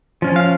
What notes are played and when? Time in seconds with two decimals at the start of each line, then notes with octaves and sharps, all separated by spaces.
0.22 F3 C#4
0.36 F5